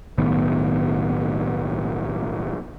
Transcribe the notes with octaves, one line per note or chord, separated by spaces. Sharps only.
B1 A2 D#3 B3